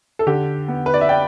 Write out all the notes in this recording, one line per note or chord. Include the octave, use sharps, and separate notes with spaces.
A4
D3 G4
B3
B4
D5
E5
D5 G5